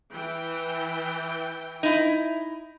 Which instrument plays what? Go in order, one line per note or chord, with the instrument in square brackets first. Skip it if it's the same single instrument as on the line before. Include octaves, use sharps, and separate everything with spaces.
[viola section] E3 G5
[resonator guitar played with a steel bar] D#4 E4